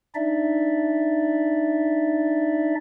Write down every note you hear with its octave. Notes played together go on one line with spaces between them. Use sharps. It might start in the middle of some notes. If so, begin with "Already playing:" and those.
D4 D#4 D5 E5